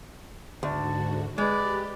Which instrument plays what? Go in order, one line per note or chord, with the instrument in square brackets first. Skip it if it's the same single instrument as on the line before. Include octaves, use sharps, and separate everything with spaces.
[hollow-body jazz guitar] D2 [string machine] G#2 D3 F#4 [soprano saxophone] A5
[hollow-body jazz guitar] G#3 [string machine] G4 [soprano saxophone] B4 [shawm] D5